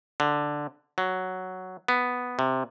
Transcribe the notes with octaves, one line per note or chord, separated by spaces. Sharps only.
D3
F#3
B3
C3